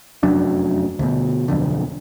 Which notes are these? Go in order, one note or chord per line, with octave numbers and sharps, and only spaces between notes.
F1 F#2 F#3 D4
D2 B2
B1 F2 D3